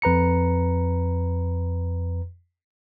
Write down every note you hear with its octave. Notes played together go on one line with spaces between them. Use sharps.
F2 B4 A#5 C#7